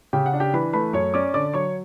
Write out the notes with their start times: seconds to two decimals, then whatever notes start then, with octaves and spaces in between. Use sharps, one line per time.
0.13 C#3 G4 G5
0.26 F#5
0.33 D4
0.40 G4 G5
0.54 E3 B4 B5
0.73 A3 B4 B5
0.93 F#2 C#5 C#6
1.14 C#4 D5 D6
1.34 D3 D5 D6
1.54 F#3 C#5 C#6